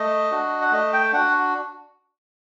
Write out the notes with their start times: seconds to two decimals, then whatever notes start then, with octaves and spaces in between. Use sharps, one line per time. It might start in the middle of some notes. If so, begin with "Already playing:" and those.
Already playing: A3 D#5
0.31 D4 F#4
0.61 F#5
0.71 A3 D#5
0.93 G5
1.13 D4 F#4 F#5